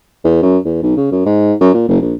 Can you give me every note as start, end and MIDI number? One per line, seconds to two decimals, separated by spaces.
0.24 0.38 40
0.42 0.58 42
0.65 0.83 40
0.83 0.94 35
0.97 1.11 49
1.12 1.25 42
1.25 1.53 44
1.61 1.70 42
1.74 1.87 46
1.88 2.00 30
2.01 2.14 34